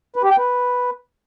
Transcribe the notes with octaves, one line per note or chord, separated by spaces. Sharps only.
B4
G4
G5
B4